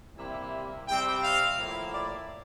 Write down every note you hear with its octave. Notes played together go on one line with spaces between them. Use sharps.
C3 G3 A#3 E4
C3 G3 C4 G5
F5
A2 F3 A#3 E4
D5